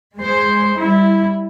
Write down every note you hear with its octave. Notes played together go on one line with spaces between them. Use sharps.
G#3 C5
G3 E4